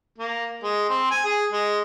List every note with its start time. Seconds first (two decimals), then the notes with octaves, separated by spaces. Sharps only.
0.18 A#3
0.63 G#3
0.90 C4
1.11 G#5
1.24 G#4
1.52 G#3